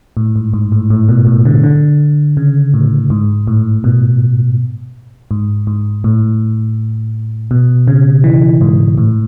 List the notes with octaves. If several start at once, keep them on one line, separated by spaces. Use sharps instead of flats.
A2
G#2
G#2
A2
A2
B2
A2
D3
D3
C#3
A2
G#2
A2
B2
G#2
G#2
A2
B2
C#3
E3
G#2
A2